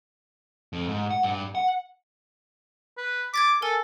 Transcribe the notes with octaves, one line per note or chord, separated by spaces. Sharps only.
F2
G#2
F#5
G2
F#5
B4
D6 G#6 A6 B6
A4 A#4 G#5